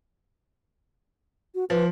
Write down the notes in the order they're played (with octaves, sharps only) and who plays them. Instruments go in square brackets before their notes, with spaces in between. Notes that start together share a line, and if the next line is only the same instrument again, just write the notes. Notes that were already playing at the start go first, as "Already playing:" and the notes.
[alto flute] F#4
[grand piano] F3 [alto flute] B4